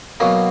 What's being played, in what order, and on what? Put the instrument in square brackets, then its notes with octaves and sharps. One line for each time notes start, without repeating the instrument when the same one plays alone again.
[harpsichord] B2 F#3 A#3